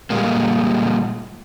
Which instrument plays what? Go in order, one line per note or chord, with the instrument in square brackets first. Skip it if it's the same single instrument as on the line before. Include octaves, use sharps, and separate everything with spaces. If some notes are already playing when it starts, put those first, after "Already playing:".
[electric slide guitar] A#2 G3 G#3 A#3